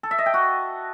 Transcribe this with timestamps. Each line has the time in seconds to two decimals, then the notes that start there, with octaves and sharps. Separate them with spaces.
0.03 A4
0.11 E5
0.18 D#5
0.26 G5
0.34 F#4